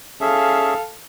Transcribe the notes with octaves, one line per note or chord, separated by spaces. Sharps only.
C#4 G#4 A4 E5 F5